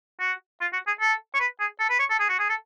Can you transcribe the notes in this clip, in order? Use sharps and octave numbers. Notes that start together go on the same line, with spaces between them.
F#4
F4
F#4
G#4
A4
C#5
B4
G#4
A4
B4
C#5
A4
G#4
F#4
G#4
A4